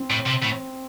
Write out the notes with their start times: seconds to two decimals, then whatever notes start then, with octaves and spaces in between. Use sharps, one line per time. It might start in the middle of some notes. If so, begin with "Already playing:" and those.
Already playing: C4
0.10 A2
0.27 C3
0.43 A2